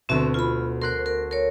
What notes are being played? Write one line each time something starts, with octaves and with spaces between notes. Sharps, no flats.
D2 B2 C4 F#4 E5
F4 B5
A#4 C5 C6 F#6 C7
A#4
A#4 C#5